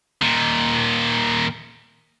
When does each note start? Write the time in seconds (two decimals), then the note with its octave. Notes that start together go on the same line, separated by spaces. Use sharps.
0.22 A#2 D#3